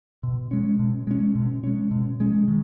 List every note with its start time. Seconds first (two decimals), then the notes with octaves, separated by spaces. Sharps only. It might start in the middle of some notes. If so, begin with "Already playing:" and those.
0.23 B2
0.51 G#3 C#4
0.79 B2
1.07 G#3 C#4
1.35 B2
1.64 G#3 C#4
1.91 B2
2.20 G#3 C#4
2.48 D#3